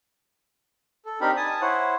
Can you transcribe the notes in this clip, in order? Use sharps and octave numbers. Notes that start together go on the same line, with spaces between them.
A4
C4 D4 D#4 G4 A#4 B5
G#5 A5 D#6
E4 C5 C#5 F#5